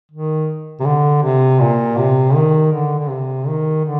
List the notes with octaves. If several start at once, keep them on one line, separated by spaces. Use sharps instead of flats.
D#3
C3
D3
C3
A#2
C3
D#3
D3
D3
C3
D#3
D3